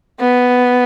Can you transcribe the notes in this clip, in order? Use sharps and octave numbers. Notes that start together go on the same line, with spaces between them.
B3